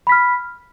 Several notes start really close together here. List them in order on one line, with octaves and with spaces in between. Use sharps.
B5 B6 F6